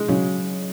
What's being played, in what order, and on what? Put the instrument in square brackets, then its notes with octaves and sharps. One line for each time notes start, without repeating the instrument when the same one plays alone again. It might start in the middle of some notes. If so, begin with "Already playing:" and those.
Already playing: [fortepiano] G#3
[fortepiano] C#3 [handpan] F#3